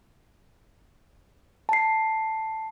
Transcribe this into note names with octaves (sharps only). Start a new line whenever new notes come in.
A5 C7